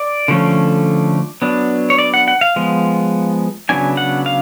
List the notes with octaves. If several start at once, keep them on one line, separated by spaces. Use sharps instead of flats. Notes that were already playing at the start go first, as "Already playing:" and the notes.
Already playing: D5
D3 F3 A3 C#4
F#3 B3 D4
C#5
D5
F#5
F#5
F5
F3 G#3 B3
C#3 F#3 B3 D4 G#5
F#5
F5